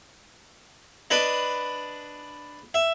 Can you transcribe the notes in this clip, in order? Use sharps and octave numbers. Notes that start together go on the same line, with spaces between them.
D4 B4 D#5
E5